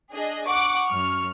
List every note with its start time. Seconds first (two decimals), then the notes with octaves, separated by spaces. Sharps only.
0.12 D4 G#4 D#5
0.47 F#5 C#6 D6
0.90 F#2 F6